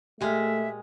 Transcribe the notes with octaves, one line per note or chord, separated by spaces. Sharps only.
A#2 G#3 A3 G4 E5 F6